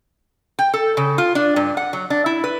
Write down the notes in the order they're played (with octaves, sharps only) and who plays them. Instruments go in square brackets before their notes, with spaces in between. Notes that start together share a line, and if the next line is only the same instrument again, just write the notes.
[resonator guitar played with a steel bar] G5
A4
C#3
F4
D4
G2
F#5
F#3
D4
E4
B4